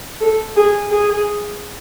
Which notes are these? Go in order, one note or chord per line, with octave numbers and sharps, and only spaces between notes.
A4
G#4
G#4